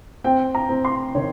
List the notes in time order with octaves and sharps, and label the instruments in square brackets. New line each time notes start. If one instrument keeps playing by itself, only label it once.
[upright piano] C4 G5
A#5
C4
C6
D#3 C#5